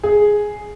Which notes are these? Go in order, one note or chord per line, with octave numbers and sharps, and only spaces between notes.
G#4